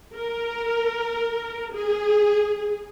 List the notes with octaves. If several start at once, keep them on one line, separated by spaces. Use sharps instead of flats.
A#4
G#4